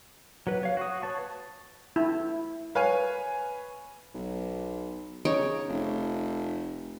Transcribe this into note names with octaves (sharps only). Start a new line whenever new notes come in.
F#3 B4
C#5 F5
F#4 C#6 D#6
B4 C#5 A5 C#6
E4
B4 C#5 F5 G#5
B1
C#3 D#4 C#5
F1